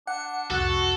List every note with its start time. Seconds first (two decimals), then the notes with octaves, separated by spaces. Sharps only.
0.07 D4 F#5 C#7
0.50 C2 F2 F#4 A4 F#5 F#6